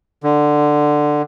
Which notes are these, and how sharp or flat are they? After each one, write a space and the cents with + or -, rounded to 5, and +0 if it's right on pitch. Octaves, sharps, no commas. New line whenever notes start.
D3 +10